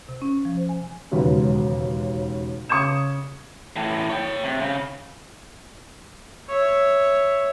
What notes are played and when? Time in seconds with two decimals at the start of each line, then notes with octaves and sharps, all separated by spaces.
0.09 C3
0.22 C#4
0.45 F3
0.57 C5
0.69 G#5
1.11 E1 D#2 G#2 C#3 F#3 B4
2.69 C#3 C#6 D#6 G#6 E7
3.76 A2 E3
4.10 C#5 G5
4.44 C3
4.61 C#3
6.49 C#5 E5